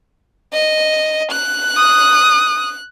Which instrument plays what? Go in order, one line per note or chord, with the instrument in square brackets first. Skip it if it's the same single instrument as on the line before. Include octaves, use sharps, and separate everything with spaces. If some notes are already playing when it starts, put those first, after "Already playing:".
[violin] D#5
F#6
[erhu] D#6